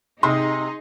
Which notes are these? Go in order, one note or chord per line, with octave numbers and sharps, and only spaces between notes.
C3 D#4 G#4 C6 D#6